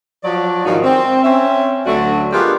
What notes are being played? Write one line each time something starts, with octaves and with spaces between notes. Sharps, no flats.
F3 F#3 D5
G#2 D3 D#3 F3 D#4 F#4
C4
C4 C#4 E5
D2 D3 F#3 A3 F#4 D5
G#3 B3 D4 F4 G4 A#4